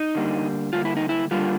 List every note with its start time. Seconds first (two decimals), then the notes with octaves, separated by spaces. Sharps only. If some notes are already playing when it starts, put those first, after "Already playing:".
Already playing: D#4
0.15 D3 G3 A#3
0.73 D3 G3 A#3 F4
0.85 E4
0.97 D#4
1.09 E4
1.31 D3 G3 A#3 F4